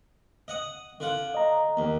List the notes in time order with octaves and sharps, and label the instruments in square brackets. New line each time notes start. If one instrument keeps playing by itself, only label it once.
[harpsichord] D#5 F#5 D#6
D3 F4 F#5
[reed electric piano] D#5 A#5
[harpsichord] D#2